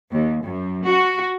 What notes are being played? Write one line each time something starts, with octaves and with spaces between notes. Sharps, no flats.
D#2
F#2
F#4